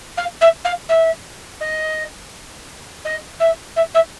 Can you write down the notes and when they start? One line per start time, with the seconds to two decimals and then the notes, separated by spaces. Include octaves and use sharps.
0.17 F5
0.41 E5
0.65 F5
0.89 E5
1.61 D#5
3.05 D#5
3.40 E5
3.76 E5
3.95 E5